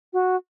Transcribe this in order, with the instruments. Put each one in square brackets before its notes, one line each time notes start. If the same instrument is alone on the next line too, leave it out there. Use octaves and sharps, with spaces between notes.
[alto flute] F#4